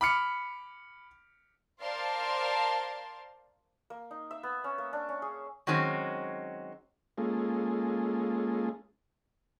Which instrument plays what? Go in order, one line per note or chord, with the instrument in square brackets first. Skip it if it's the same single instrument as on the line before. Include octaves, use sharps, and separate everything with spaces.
[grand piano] B5 D6 F6 C#7
[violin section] A#4 C5 D5 F5 A5 C6
[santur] A#3
D#4
E5
B3
C#4
A#3
D4
C#4
G#4
[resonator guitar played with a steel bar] D#3 F#3 G#3 C4 C#4
[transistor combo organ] G#3 A#3 C#4 F4 G#4 A4